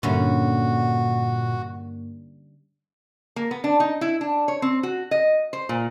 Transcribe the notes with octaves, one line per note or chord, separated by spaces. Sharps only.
G2 A#2 D3 G3 A#3 C#4 F#4
A#3
B3
D4
D#4
E4
D4
C#5
C4
F#4
D#5
C5
A#2